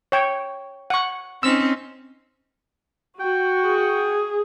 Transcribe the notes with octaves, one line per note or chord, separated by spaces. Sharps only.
C#5 G5
F#5 C#6
C4 C#4 D#4 E6
F#4 G5
G#4